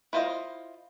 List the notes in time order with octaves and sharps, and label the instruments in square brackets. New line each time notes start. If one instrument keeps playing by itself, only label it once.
[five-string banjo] E4 F4 C5 D5 D#5